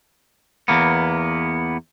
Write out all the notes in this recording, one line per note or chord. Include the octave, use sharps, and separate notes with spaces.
E2 A#3 B3